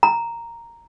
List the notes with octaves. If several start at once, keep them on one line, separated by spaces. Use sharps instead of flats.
A#5